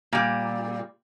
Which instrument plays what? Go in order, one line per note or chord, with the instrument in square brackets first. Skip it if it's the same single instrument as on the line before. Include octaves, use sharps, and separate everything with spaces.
[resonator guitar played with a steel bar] A#2 G3